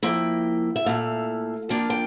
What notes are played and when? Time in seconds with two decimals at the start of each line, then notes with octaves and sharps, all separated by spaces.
0.03 F3 A#3 E4 G5
0.76 E5
0.86 A#2 A3 E4 F5
1.69 F3 A#3 D4 F4 G5
1.90 G5